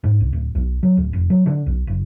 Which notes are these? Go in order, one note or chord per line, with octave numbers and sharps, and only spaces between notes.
G#2
C2
D1
B1
F#3
D1
F1
F#3
D3
B1
F#1